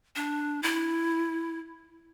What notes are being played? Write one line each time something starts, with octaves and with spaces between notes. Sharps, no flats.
D4
E4